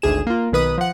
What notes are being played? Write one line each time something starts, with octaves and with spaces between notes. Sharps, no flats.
G#1 D2 G#4 E7
A#3 F4
B1 D#3 B4 D#6
F3 F#5